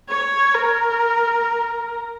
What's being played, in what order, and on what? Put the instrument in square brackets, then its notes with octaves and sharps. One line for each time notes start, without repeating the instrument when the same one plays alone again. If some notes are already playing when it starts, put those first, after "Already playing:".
[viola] C#5
A#4